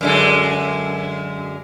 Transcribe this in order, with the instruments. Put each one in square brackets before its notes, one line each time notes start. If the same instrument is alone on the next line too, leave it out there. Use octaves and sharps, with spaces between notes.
[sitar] F#2 D3 G#3